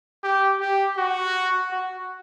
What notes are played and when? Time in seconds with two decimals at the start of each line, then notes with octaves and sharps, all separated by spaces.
0.23 G4
0.60 G4
0.97 F#4
1.72 F#4